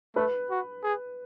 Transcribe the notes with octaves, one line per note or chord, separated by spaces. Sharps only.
A3 B4
F#4
G#4